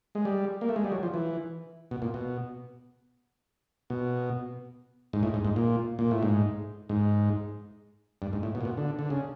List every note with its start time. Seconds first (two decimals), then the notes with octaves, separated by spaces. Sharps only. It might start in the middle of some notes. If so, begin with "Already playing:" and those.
0.15 G#3
0.25 G3
0.61 A#3
0.69 A3
0.76 G#3
0.84 G3
0.92 F#3
1.03 F3
1.14 E3
1.91 B2
2.02 A#2
2.14 B2
3.90 B2
5.13 G#2
5.23 A2
5.34 G#2
5.45 G#2
5.56 A#2
5.99 A#2
6.11 A2
6.23 G#2
6.89 G#2
8.22 G2
8.33 G#2
8.43 A2
8.55 B2
8.61 A#2
8.65 B2
8.77 D3
8.99 D3
9.10 C#3